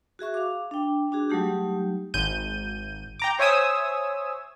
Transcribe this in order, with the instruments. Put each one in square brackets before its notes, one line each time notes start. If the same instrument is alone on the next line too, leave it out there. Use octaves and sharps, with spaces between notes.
[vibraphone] F#4 G#4 E5 C#6
F5 D6
D4 G5
D4 F#4 G#4
F#3 G3 A3 D#4 G4
[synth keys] G#1 G6 D#7
G5 A#5 D6
C5 C#5 E5 G#5 D#6 E6